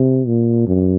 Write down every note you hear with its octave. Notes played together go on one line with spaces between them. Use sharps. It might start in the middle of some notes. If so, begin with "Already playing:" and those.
Already playing: C3
A#2
F#2